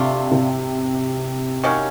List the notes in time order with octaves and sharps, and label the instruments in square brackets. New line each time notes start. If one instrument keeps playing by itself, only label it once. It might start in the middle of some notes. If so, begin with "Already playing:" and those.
Already playing: [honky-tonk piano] C3 [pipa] A3 D4 F4
[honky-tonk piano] C3
[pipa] D#3 F#3 A#3 C#4